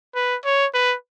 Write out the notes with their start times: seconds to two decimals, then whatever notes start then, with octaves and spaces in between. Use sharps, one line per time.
0.15 B4
0.45 C#5
0.74 B4